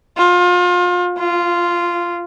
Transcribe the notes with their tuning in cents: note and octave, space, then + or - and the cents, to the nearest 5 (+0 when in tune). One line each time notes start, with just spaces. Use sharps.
F4 +30
F4 -10